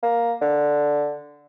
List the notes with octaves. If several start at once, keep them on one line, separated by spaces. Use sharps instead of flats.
A#3
D3